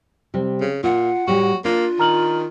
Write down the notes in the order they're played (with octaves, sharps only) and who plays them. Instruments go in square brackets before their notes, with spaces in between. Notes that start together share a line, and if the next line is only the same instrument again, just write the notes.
[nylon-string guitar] C3 G3
[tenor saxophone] C#3
[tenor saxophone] A#2 [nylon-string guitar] F4 [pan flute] F#5
[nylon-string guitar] A2 G3 G4 [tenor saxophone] F#4
[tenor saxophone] A#3 [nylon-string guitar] D4 [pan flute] F4
[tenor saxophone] D#3 [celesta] A#5 F6 F#7